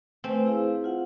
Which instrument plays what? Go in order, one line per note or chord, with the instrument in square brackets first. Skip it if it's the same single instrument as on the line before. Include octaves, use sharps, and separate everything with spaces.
[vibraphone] A3 B4 G#5 [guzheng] C4
[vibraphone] E4 G#4 F5
F4 F#5